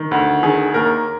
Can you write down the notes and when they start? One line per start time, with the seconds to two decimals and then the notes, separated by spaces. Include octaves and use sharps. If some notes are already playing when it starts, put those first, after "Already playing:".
Already playing: D#3
0.11 D2
0.43 D#3 G#4
0.74 D#2 A#4